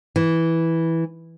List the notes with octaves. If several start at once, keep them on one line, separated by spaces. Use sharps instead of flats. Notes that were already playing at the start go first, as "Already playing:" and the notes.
E3